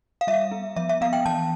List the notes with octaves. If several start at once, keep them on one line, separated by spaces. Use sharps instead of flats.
F5
G3 E5
B3
F3 E5
E5
B3 F5
G5
E3 A5